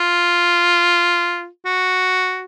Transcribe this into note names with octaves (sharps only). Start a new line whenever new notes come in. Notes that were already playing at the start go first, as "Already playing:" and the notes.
Already playing: F4
F#4